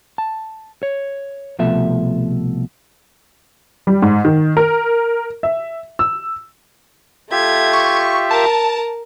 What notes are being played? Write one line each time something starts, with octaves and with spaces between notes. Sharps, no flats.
A5
C#5
C2 B2 F3 A3 E5
G3
G#2
D#3
A#4
E5
E6
A3 F4 G4 E5 G#6
C#6
A#4 A5